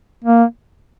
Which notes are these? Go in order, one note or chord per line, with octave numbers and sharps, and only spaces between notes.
A#3